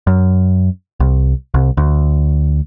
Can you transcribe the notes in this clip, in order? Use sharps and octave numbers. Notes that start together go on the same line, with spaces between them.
F#2
C2
C2
D2